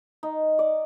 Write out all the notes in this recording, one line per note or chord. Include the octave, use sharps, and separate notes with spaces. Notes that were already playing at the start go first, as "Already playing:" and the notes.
D#4
D5